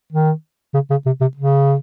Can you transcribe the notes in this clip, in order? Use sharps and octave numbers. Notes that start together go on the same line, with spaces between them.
D#3
C#3
C#3
C3
C3
C#3